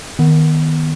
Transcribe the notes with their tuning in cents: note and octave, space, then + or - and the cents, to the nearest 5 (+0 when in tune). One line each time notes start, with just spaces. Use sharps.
D#3 +0 B3 +0